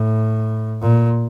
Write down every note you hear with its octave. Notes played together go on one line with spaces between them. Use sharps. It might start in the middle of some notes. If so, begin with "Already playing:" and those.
Already playing: A2
A#2